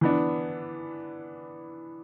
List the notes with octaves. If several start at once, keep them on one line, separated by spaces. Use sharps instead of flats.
E3 B3 D4